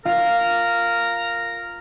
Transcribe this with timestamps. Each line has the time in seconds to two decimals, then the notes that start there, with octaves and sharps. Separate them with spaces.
0.05 F4 A#4 F5